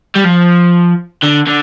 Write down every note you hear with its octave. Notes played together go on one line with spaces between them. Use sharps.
G3
F3
D3
D3